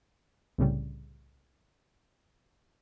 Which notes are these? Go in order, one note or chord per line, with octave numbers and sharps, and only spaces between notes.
C2 A2 C#3 G3